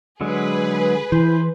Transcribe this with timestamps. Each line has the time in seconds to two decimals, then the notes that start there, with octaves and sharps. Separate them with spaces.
0.21 D3 F#3 G#3 G#4 B4
1.12 E3 E4 C5